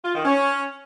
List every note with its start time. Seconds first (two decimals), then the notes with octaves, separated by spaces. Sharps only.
0.05 F4
0.15 D#3
0.25 C#4